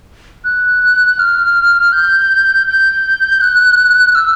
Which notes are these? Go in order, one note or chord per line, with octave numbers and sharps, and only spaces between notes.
F#6
F6
G6
G6
F#6
E6